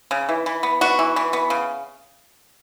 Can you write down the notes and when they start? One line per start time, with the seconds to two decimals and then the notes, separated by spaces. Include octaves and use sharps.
0.11 C#3
0.29 E3
0.46 E3
0.63 B3
0.81 B3 F#4
0.99 E3
1.16 E3
1.33 B3
1.50 C#3